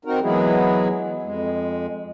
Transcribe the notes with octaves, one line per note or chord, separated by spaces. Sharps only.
C4 D#4 F#4 A#4
E3 F#3 G#3 B3 E4 G#4
F2 G#3